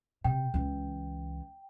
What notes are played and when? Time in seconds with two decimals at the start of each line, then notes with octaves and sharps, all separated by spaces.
0.24 C3 G5
0.54 C#2 E3